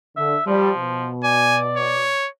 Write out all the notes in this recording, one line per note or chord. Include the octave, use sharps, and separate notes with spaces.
D3 E5
F3 G3
B2
D5 G#5
C#5